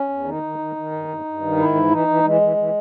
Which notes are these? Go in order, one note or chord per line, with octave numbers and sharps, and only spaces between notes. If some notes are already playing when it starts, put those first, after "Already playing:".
Already playing: C#4
E2
D#3 D#4
D#3
D#3
D#3
G2
G2
G2
D#3
G#2 E4
E3
E3 D#4
E3
E3 G#3
E3
E3